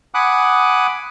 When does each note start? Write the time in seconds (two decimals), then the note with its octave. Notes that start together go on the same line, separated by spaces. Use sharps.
0.14 F#5 G#5 B5 D6 D#6 F#6